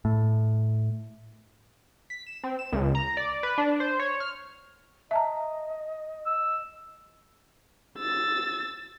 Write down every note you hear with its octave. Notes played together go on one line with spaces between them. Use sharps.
A2
B6
E7
C4
E7
C#2
A#5
D5
B4
D4
C5
C#5
F6
D#5 E5 A5 A#5
E6
E6 A6